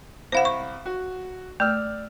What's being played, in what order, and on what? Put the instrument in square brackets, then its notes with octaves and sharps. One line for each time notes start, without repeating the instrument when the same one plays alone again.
[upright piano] C2 B5 [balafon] C5 F5 F#5
[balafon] C#6
[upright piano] F#4
[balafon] A3 [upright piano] D5 E6 F6